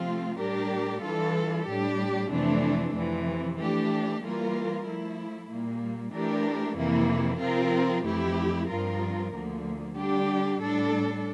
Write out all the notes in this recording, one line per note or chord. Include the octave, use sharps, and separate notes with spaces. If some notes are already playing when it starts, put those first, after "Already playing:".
Already playing: C3 F3 A3 C4 F4
A2 G3 D4 G4 A#4
E3 G3 D4 F4 A4
A2 G3 D4 G4
F2 C3 E3 A3 D4
F2 C3 E3
E3 A3 D4 G4
E3 G3 A#3 F4 A#4
F3 A3 E4
A#2 G3 A#3
E3 A3 D4 G4 A#4
F2 C3 E3 A#3 E4
C3 F3 C4 F4 A#4
F2 E3 A3 E4 G4
G2 F3 C4 F4 A#4
D2 D3 F3 A#3
D3 G3 D4 G4
A2 G3 D4 A4